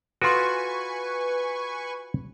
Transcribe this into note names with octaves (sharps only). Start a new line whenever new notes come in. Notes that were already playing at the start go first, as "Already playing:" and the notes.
F4 F#4 A4 B4 G#5 C6 C#6